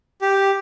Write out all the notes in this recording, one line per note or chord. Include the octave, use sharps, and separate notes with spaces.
G4